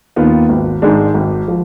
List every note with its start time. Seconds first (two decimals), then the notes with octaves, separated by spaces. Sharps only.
0.16 D#2 D#3 B3 F4
0.49 G#1
0.82 G#2 D#3 G#3 D4
1.14 G#1
1.48 F3